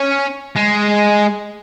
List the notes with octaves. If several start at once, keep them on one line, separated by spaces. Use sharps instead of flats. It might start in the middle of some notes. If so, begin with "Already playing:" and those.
Already playing: C#4
G#3